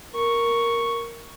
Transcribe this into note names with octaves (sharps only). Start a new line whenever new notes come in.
A#4 C#6